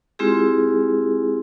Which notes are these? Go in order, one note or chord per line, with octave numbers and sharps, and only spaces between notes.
G#3 C4 E4 F4 G4 G#4